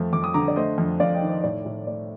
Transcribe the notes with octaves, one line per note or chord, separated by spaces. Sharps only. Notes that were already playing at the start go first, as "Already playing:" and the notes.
Already playing: F2 A3
F2 D6
D#6
D3 A#5 D6
D5
A3 C5 D#5
F2
F2 D5 F5
D#5 G5
D#3
C5 D#5
A2 D5
A2
A3 D5